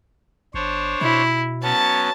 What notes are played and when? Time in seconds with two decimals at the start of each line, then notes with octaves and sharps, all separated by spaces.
0.54 G1 D4 C5 C#5
1.01 B2 E4
1.63 F#3 B3 C#4 A5